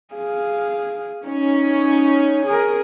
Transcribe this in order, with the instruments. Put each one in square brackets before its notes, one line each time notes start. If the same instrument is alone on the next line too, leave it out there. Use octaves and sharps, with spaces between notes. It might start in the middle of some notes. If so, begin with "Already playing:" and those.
[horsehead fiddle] G#4 F5
[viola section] C#4 [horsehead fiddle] D#4
[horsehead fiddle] G#4 A#4